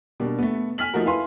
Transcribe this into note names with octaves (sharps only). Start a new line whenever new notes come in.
B2 G3 A#3 D4
A3 B3
G#5 F6 B6 F#7
F3 A3 D#4 F#4 A#4
E4 A4 B4 F5 G#5 C6